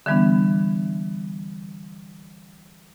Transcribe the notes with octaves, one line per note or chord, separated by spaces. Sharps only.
D3 E3 G3 B3 D4